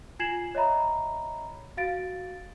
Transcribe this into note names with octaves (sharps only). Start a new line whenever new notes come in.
F4 G#5 G#6 C7 E7 F#7
C#5 D#5 E5 A#5 B5
F#4 F5 A6 D7